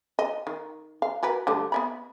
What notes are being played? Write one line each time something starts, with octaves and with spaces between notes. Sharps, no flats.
D#5
D#3
F5
F#4 A#4 B4
D3 G3 A3
B3 E5 B5